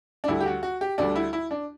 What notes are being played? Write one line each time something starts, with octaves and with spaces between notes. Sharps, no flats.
D4
D2 D3 G3 E4
G4
F#4
F#4
G4
D2 D3 G3 D4
E4
E4
D4